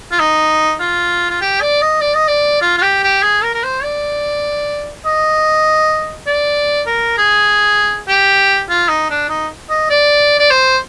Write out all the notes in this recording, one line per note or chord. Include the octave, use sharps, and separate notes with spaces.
F4
D#4
F4
F4
G4
D5
D#5
D5
D#5
D5
F4
F4
G4
G4
G#4
A#4
A#4
C5
D5
D#5
D5
A#4
G#4
G4
F4
D#4
D4
D#4
D#5
D5
D5
C5